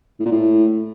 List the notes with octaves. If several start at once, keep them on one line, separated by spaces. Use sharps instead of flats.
A2
A#2
A2